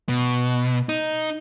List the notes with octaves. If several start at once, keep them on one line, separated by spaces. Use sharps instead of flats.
B2
D#4